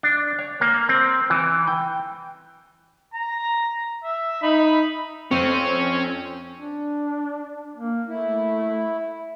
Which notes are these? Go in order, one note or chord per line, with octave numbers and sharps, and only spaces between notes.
D4
C#5
A#3
C4
E3
G5
A#5
E5
D#4 B5
F2 C4 C#4
D4
A#3
A3 E4